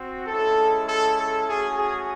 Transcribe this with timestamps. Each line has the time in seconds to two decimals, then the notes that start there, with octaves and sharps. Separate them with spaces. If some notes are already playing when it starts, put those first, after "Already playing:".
Already playing: C4 F#4
0.28 G#3 C#4 E4 A4
0.87 A4
1.18 A4
1.47 A3 C#4 F#4 G#4
1.78 G#4